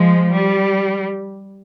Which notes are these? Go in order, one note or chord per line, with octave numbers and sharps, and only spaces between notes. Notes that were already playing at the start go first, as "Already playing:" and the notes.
Already playing: F3 G#3
G3